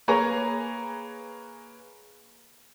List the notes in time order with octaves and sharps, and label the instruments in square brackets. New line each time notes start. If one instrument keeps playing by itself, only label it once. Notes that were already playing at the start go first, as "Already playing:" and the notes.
[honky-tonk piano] A#3 G#4 B4 C#5 A#5